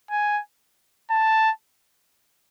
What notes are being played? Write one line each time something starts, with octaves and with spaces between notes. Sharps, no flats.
G#5
A5